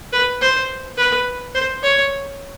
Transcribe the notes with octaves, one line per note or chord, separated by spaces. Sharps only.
B4
C5
B4
C5
C#5